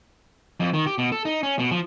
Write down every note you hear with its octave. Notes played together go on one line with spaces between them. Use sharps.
F2
D#3
G4
B2
A4
D#4
C#4
B2
F3